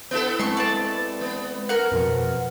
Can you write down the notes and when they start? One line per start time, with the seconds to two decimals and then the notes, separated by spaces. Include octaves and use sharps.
0.11 B3 E4 A4
0.39 G#3 C4 C6 C#6
0.57 D5 A5
1.21 B3
1.69 A#4 F#5
1.91 F2 B2 F3